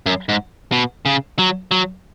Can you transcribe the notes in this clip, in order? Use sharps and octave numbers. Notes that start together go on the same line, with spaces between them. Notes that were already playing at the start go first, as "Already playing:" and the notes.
F#2
G#2
B2
C#3
F#3
F#3